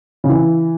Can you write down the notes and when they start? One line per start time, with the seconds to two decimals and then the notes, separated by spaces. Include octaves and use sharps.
0.24 C#3
0.29 E3